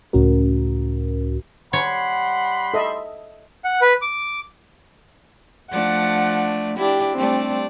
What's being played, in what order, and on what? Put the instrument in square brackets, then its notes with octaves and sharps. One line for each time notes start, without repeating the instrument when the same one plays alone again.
[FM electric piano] C#2 A2 C#4 F#4 A#4
[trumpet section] G3 B5 C6 [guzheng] C#5 [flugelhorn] F#5
[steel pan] A4 D#5 E5
[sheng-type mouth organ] F#5
B4
D6
[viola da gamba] F3 A3 D4 [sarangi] F#5
[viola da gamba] D4 E4 [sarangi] G4
[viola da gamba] G3 A3 D4 [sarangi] C4